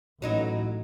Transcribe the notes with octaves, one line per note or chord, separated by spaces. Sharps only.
A1 F#3 D#4 E4